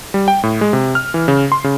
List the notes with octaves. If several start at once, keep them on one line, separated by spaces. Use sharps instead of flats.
G3
G5
A2
G#3
C3
F6
E3
C#3
C6
C#3